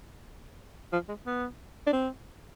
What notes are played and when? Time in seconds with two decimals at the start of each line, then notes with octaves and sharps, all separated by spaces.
0.93 F3
1.09 G#3
1.26 B3
1.87 D4
1.93 C4